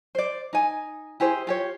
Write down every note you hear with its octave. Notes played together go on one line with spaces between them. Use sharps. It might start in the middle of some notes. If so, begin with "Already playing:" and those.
C5 D5
D#4 G#5
E4 G4 G#4 C5
F4 G4 C#5